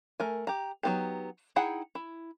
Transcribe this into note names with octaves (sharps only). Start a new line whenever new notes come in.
A3 A#4 G#5
G4 A#5
F#3 A#3 B3 D#4 G4
D#4 E4 G#4 F#5 G5
E4